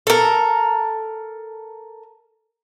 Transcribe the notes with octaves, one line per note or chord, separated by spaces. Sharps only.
A4 A#4